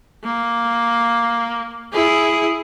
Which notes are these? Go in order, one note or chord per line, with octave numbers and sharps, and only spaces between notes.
A#3
E4 G#4